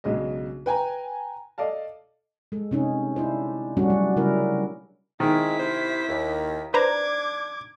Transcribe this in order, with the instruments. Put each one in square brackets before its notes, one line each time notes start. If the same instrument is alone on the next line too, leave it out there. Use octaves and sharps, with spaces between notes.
[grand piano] B1 C#3 G#3 D4 D#5
B4 G5 G#5 A#5
A4 D5 D#5 F5 A5
[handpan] G#3 A4
C3 C#4 D#4
D4 E4 C5
G3 A3 C#4 D4 F#4
F#3 G3
C#3 G3 E4 A#4
[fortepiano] D#3 [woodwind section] G#3 C4 [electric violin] E4 B6
[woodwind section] C3 C5
D#2
[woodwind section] D4 [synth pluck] B4 C5 A#5 [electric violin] D6 G#6